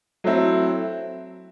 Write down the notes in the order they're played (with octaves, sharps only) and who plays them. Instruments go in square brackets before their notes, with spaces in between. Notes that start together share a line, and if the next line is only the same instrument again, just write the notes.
[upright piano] F#3 A3 C4 E4